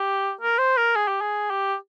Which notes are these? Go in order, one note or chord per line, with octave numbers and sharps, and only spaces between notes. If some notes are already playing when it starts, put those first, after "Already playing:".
Already playing: G4
A#4
C5
A#4
G#4
G4
G#4
G4